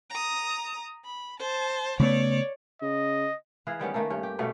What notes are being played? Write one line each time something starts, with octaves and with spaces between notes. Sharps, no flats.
A#5 D#6
B5
C5 A5
C#3 A3 B3 C#5 D5
C#3 D#5
E3 G#4 B4 F5
D#3 G3 B3 C#4
D#3 A3 A#3 A4
G2 C#4
G4
B2 A3 B3 C#4